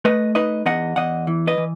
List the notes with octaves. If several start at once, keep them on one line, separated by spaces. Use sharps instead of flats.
A3 B4 D#5
D#4 B4 D#5
E2 D#5 F#5
E2 D#5 F#5
E3
B4 D#5
E3